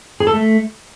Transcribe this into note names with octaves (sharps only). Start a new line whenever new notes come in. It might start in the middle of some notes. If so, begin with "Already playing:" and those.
G#4
A4
A3